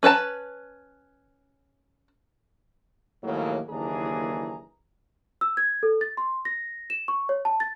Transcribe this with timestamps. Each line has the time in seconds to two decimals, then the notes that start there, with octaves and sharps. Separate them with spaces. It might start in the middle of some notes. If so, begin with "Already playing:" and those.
0.03 C#4 B4 C#5 A5 A#5
3.23 D#2 A2 C#3 F3 F#3 A#3
3.69 F#1 D#2 E3 D4 G#4 A#5
5.41 E6
5.57 G#6
5.83 A4
6.01 A6
6.17 C6
6.45 A#6
6.90 E7
7.08 C#6
7.29 C#5
7.45 A5
7.60 A6